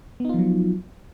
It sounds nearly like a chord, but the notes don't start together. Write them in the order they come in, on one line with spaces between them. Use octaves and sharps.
B3 D#4 F4 F3 F#3